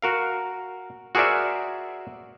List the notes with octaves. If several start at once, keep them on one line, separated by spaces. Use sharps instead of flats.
F#4 A#4 F5
F#4 G#4 A#4 C5 D5 E5